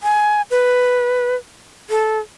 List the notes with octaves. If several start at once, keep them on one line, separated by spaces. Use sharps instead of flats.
G#5
B4
A4